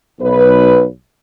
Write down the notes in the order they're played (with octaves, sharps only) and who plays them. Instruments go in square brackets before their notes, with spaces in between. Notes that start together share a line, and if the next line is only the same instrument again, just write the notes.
[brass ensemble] B1 B4